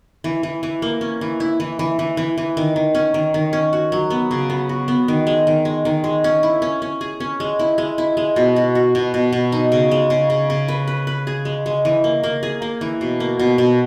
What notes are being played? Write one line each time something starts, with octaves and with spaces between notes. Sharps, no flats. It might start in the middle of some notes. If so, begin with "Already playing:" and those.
E3
E3
E3
A#3
C#4
E3
E4
E3
E3
E3
E3
E3
D#3
D#3
C#4
D#3
D#3
C#4
F#4
F#3
B3
C#3
B3
F#4
B3
D#3
G#3
D#3
G#3
D#3
G#3
C#4
E4
C#4
C#4
G#4
C#4
G#3
E4
G#3
E4
G#3
B2
F#4
F#4
B2
B2
B2
D#4
C#3
G#3
C#3
C#3
C#3
B4
B4
B4
G#4
G#3
G#3
E3
A#3
A#3
G#4
A#3
E3
B2
A#3
B2
B2